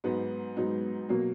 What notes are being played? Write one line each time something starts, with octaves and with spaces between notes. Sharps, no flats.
G#2 F#3 B3 D#4
G#2 F#3 B3 D#4
B2 F#3 A#3